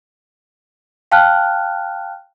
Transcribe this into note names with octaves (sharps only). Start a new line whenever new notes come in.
F5 G5 A5 F6 F#6